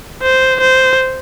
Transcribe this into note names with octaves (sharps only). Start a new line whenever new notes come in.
C5
C5